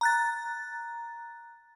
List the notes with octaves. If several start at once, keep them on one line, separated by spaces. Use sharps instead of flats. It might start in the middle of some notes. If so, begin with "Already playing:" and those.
A#5 F#6 A6